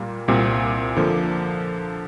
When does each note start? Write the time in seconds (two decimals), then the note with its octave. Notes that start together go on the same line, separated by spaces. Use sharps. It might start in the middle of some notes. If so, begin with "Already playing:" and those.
Already playing: A#2 G3 A#3 F4
0.28 C2 A#2 G3 C4
0.97 D3 F3 A#3